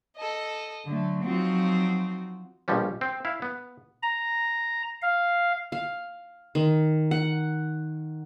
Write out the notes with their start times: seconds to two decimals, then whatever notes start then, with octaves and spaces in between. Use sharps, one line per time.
0.17 A4 D#5
0.87 D3 F#3 A3
1.24 F3 F#3 C4 D#4 F4 F#4
2.68 A#1 B2 F3 G3 C#4
3.01 C4
3.25 E4 F5
3.42 B3
4.03 A#5
5.02 F5
5.72 F5
6.55 D#3
7.11 F#5